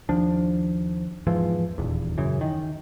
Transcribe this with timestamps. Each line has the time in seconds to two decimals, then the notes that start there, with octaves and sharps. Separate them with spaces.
0.09 D#2 F3 D4
1.27 E2 G#2 E3 F3
1.78 D#1 E2
2.18 F#2 C#3 E3
2.41 D#3